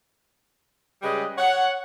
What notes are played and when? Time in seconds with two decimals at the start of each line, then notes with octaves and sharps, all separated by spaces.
1.03 C#3 G3 G#3 G#4 B4 D#5
1.38 C#5 F#5